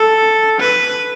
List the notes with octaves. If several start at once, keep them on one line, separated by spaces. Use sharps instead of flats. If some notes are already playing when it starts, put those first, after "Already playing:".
Already playing: A4
B4